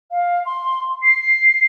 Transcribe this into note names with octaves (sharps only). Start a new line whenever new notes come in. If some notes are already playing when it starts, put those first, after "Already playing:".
F5
C6
C7